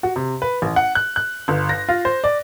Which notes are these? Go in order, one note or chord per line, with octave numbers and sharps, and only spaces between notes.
F#4
C3
B4
A1
F#5
F#6
F#6
G1
A#6
F4
C5
D5